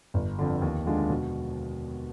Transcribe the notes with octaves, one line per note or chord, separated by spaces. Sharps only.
G1
F2 D3
D#2
D3 G#3 D4 F4
B2